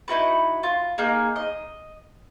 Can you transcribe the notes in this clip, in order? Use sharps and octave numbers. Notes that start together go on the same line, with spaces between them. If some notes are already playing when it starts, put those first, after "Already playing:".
D#4 E4 F#4 B4
F4
A#3 D#4 G#4
D#5